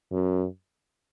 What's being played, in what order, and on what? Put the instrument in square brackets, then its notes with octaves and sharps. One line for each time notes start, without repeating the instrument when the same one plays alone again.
[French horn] F#2